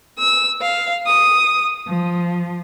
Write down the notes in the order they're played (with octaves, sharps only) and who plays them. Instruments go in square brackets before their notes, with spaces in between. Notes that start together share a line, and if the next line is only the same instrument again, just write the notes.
[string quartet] E6
F5
D#6
F3